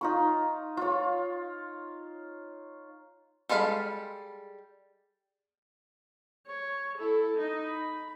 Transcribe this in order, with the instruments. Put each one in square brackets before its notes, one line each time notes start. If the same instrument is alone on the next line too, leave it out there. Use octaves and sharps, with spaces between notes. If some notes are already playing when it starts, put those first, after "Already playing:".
[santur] D#4 F4 C#6
F4 C#5
[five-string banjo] G3 G#3 A4 F5 B5
[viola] C#5
E4 A4
D#4
B5